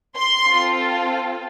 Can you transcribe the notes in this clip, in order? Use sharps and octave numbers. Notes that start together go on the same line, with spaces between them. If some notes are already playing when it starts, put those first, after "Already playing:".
C6
C4 F4 A4